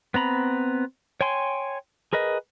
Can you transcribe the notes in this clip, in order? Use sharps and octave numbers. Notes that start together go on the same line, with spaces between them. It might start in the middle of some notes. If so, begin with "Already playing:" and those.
B3 C4 A#5 B5
C#5 G5 G#5 C6
G#4 A#4 B4 D#5